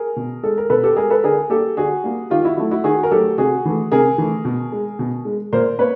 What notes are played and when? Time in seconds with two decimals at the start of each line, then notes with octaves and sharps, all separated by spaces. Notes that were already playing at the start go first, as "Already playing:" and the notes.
Already playing: G#4 A#4
0.16 B2
0.43 G#3 A4
0.58 A#4
0.70 B2 A4 B4
0.83 G4 A4
0.96 G#3 G#4 A#4
1.10 A4 B4
1.24 D3 G#4 A#4
1.50 G3 A#3 G4 A4
1.77 D3 F#4 G#4
2.04 G3 A#3
2.30 D#3 F4 G4
2.44 E4 F#4
2.57 F#3 A3 E4
2.71 E4 F#4
2.84 D#3 F#4 G#4
3.03 A#4
3.11 F#3 A3 G4 A4
3.38 C3 F#4 G#4
3.65 E3 A3
3.92 C3 G#4 A#4
4.18 E3 A3
4.45 B2
4.72 G#3
4.99 B2
5.25 G#3
5.53 A#2 A#4 C5
5.79 A#3 B4 C#5